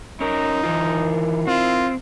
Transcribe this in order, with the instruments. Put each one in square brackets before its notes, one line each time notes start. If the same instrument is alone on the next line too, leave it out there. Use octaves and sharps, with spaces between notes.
[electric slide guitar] C#4 A#4 [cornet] D#4
[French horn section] D#3 E4 A#4 [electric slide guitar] E3 F4
[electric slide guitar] C4 [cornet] F4